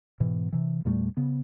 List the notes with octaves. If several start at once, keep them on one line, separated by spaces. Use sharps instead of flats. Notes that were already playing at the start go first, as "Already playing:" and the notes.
G#2 B2 E3
C3 E3
E2 A#2 G3 A3
C#3 B3